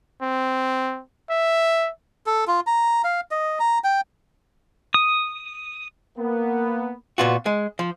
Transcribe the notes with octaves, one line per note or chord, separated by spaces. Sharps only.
C4
E5
A4
F4
A#5
F5
D#5
A#5
G5
D#6
A#3 B3
A#2 B3 F4 F#4
G#3
F3